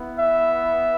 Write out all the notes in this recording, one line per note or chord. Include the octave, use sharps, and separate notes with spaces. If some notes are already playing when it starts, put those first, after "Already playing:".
Already playing: B3 E4
E5